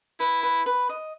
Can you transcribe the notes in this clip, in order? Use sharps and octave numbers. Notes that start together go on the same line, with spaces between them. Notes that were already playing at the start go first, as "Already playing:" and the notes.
E4 B4
B4
B4
D#5